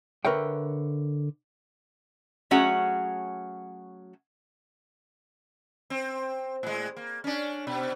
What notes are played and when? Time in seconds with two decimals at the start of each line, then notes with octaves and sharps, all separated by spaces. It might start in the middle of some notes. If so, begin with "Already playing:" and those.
0.25 D3 A#4 B4 C#5 E5 G5
2.51 F#3 A3 C#4 F#4 G#4 F#5
5.90 C4
6.63 A2 G#3
6.97 A#3
7.24 C#4 D4
7.67 B2